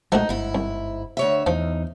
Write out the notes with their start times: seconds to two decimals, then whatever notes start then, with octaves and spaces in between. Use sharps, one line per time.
0.12 A#1 F3 G#3 A3 D#4 F#4
0.29 G1 G#2 E4
0.55 C2
1.17 D2 C#5 E5
1.47 E2 F3 D#4